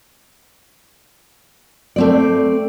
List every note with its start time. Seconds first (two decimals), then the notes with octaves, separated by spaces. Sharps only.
1.96 A3 C4 D5